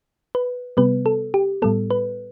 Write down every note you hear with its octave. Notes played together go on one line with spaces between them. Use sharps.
B4
C3 G3 B3 B4
A4
G4
A2 G3 B3 A4
B4